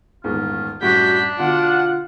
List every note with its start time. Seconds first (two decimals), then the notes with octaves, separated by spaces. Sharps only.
0.24 D#1 E2 G#2 F4
0.82 F#2 A2 G3 D4 F#4 G6 B6
1.39 B2 D3 F4 F#5